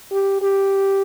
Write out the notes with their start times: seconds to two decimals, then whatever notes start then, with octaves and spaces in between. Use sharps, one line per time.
0.12 G4
0.42 G4